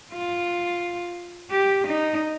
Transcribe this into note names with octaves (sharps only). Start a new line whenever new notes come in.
F4
G4
D#4